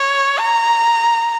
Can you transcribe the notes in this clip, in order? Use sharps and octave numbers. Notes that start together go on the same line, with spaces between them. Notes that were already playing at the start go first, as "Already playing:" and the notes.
Already playing: C#5
A#5